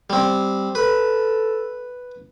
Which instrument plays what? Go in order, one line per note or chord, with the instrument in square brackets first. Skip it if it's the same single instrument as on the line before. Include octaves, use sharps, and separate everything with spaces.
[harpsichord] G3 C4
[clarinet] A4 [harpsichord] B4